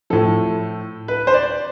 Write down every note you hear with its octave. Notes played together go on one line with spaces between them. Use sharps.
A2 F3 A4
B4
C5
D5